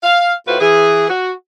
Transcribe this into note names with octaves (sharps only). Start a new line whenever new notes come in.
F5
A2 F4 F#4 B4 C5
E3 G#4
F#4